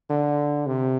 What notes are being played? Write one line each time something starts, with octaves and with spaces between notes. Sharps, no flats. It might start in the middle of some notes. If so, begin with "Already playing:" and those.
D3
C3